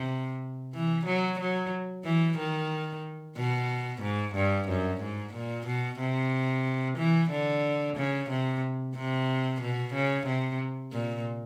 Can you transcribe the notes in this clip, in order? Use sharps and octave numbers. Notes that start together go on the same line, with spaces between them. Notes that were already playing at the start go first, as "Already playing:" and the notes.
Already playing: C3
E3
F#3
F#3
E3
D#3
B2
G#2
G2
F#2
G#2
A#2
B2
C3
E3
D3
C#3
C3
C3
B2
C#3
C3
A#2